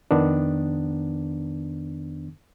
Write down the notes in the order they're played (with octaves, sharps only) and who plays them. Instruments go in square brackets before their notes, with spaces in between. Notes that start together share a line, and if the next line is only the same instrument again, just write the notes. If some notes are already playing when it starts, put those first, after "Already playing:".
[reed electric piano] F2 D#3 B3 D4